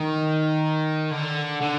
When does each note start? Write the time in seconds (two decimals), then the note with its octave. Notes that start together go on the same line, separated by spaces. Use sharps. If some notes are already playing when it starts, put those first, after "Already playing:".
Already playing: D#3
1.11 D3
1.62 D3